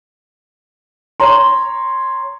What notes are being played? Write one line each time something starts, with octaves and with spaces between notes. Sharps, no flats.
C#5 A#5 C6